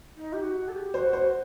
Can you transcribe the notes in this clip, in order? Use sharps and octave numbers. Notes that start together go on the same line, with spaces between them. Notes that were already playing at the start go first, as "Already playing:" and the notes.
D#4
G4
F#4
A4
G4
F#4 C5
C5